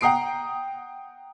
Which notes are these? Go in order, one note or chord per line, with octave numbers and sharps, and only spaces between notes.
F#5 G5 A#5 D#6 C7 D7